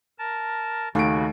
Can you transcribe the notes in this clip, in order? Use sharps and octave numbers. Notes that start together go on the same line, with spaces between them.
A#4 A5
D#2 C#3 A3 F#4 D7